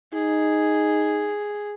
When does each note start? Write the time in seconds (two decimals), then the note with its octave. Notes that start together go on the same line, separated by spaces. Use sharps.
0.14 D#4 G#4